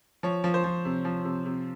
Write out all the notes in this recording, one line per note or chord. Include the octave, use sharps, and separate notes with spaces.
F3 C#5
F3
C5
F3
C3
F3
C3
C3